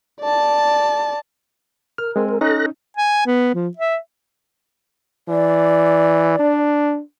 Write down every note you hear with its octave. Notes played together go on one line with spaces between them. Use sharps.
D5 A5
A#4 F6
G#3 C4 G#5
A#4
C#4 D#4 A4 F#6 A#6
G#5
B3
F3
E5
E3 D5
D4